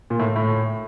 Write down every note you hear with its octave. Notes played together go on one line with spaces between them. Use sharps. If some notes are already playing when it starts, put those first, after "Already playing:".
A#2
A2
A2